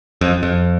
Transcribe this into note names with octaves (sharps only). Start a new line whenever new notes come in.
F2
F2